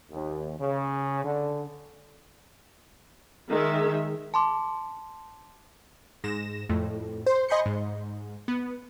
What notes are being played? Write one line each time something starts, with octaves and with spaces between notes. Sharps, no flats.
D#2
C#3
D3
D#3 G#3 E5
A5 C6 D6
G#2 A#6 E7
F2 A2
C5
D#5 G#5 B5 C6 G6 C#7
G#2
B3